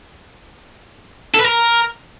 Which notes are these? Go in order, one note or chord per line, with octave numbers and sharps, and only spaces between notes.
A4
B4
A#4